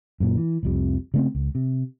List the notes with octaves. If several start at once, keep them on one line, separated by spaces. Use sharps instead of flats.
F#2 A#2
E3
F1 C2 F2 C3
C#3 A3 C4
C#2
C3